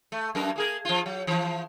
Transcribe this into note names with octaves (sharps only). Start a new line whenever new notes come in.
A3
F#2 A#4
A#3 G#4 A#4
F3 F4
F#3
E3 F3